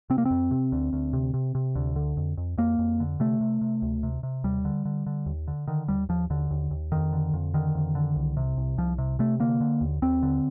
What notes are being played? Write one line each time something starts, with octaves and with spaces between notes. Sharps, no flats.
C3 C4
A#3
C4
F2
C3
D2
D2
C3
C3
C3
D2
D3
F2
F2
F2 A#3
F2
D3
C3 A3
C3
C3
D2
C3
C3
D#2 G3
D3
D3
D3
D#2
D3
D3 D#3
D#2 G3
D#2 F3
D#2 D3
D#2
D#2
F2 D#3
D3
F2
D3 D#3
F2
D3
C2
C3
C2
C2 F3
C3
C3 A3
D3 A#3
D3
D#2
D#2 C4
D3